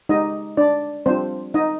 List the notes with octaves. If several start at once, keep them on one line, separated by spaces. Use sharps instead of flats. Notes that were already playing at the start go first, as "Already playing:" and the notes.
G#3 D#4 G4 D#5
D4 D5
G3 C4 D4 F4 C5
D#4 D#5